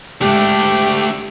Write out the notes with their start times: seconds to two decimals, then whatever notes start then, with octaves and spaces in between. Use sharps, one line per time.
0.21 G#2 G#3 A3 D4 G4